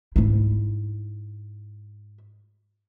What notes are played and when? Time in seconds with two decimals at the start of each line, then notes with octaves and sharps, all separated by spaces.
0.16 G#2 E4